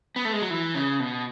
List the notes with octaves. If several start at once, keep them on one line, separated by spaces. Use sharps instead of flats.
B3
A3
G#3
F#3
E3
C#3
B2